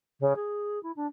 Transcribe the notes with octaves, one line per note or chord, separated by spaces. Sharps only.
C#3
G#4
E4
D4